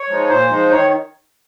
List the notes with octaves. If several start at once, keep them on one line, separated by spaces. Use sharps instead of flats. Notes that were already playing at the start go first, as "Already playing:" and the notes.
Already playing: C#5
F3 G#3 D#4
A#2 C5
F3 G#3 D#4
D#3 C#5